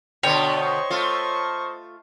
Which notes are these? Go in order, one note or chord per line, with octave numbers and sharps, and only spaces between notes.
B2 D3 B3 C#5 G5
C5 D#5 C#6
A3 F4